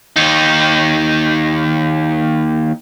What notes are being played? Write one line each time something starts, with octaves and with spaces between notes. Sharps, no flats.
D#2 D#4